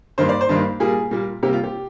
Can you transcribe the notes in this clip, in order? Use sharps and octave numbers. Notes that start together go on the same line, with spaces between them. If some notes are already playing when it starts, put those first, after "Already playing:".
G2 D#3 A#3 C5
D5
C5
G2 D#3 A#3
A#2 G3 A#3 G#4
A#2 G3 A#3
C3 G3 A#3 G4
F4
G4